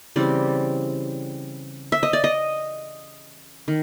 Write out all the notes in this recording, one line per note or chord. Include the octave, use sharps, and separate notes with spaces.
C#3 E3 G3 C4 D5
E5
D#5
D5
D#5
D#3